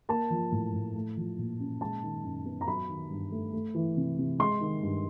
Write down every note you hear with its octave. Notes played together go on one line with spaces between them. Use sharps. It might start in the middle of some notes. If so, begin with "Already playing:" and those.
A#3 A5
F3
A2
A2
A3
F3
A#2
C#4
G#3 A5
D#3
F#2
B3
A#5
F#3 B5
D#3
G2
A3
A3
E3
C3
C3
G#3 C6
D#3
G2